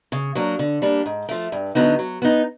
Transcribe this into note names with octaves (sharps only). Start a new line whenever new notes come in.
C#3
F#3 A#3 D4
D3
G3 A#3 D4
G#2
F3 A3
G2
D3 F#3 B3 D#4
F#3
B3 D#4